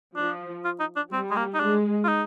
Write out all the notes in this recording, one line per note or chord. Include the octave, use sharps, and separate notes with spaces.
F3 D4
F4
D#4
D4
G3 C4
G#3
A#3
D#4
G#3 D4
F4
D#4